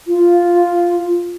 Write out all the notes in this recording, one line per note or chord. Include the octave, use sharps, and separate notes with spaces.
F4